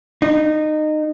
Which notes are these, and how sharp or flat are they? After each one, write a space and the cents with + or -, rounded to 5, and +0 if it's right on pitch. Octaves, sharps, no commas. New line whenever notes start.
D#4 -20